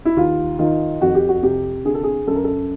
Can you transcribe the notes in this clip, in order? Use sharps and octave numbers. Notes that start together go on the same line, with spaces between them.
E4
D#2 F4
D#3 F4
F2 F#4
G4
F#4
C3 G4
D3 G#4
A4
G#4
F#2 A4
A#4
A4